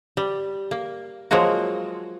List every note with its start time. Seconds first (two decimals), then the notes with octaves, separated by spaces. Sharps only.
0.17 G3
0.71 A#3
1.31 F3 F#3 G#3 A#3 F#4